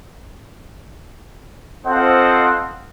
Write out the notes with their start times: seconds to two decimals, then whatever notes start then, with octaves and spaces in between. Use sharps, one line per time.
1.86 C4 F4 A4 C5 D#5 F#5